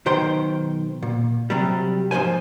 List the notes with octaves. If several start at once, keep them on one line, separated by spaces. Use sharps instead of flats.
B1 D#3 C5 G5 C6
A#2
C3 F#3 G3
G#2 F3 A3 C5 G#5